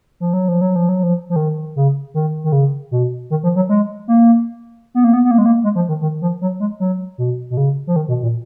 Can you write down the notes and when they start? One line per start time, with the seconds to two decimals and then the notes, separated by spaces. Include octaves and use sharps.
0.20 F3
0.33 F#3
0.48 F3
0.61 F#3
0.76 F3
0.89 F#3
1.03 F3
1.30 F3
1.36 D#3
1.76 C#3
2.14 D#3
2.44 D#3
2.52 C#3
2.91 B2
3.30 D#3
3.43 F3
3.56 F#3
3.69 G#3
4.08 A#3
4.95 B3
5.04 A#3
5.13 B3
5.25 B3
5.31 A#3
5.38 G#3
5.46 A#3
5.64 G#3
5.76 F3
5.89 D#3
6.01 D#3
6.22 F3
6.41 F#3
6.60 G#3
6.80 F#3
7.18 B2
7.50 B2
7.57 C#3
7.87 F3
7.96 D#3
8.08 B2
8.22 A#2